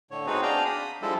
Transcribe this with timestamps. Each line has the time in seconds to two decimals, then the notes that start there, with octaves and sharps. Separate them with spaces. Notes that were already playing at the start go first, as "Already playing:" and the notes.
0.11 A2 D3 C#5
0.27 B3 C4 D#4 F#4 G#4 B4
0.43 D4 G#4 D5 F5 G5 A#5
0.65 B5 D#6
1.02 F3 G3 G#3 D4 E4 A4